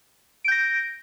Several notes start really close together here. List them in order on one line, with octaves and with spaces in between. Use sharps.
D7 G6 A#6